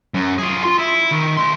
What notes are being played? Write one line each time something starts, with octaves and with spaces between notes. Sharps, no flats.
F#2
F4 G#4
F4 C6
E4
D#3
A3 C6